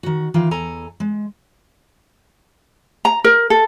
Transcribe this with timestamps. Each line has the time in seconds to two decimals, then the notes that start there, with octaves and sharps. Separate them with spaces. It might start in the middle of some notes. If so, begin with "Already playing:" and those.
0.03 D#3 F#4
0.34 D#3 E3 F4 G5
0.51 E2 A4 G#5 A#5
1.00 G#3
3.05 A#5
3.24 A#4
3.50 A4